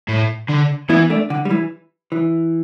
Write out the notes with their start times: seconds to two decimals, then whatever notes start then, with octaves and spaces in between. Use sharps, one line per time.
0.09 A2
0.49 D3
0.89 E3 B3 E4
1.10 A3 D4
1.30 D3
1.45 G3
1.51 E3
2.12 E3